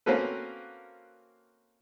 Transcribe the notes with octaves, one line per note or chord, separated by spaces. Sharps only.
A#3 C4 C#4 F#4 A4 B4